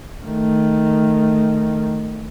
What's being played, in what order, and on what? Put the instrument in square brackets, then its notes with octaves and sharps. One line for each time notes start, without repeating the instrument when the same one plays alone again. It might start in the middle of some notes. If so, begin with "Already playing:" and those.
[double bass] D#3 A3